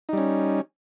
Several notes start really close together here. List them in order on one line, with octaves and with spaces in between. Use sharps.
D#4 G3 C#4